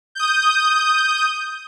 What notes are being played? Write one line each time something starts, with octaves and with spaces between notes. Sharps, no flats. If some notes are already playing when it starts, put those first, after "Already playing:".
D#6 G6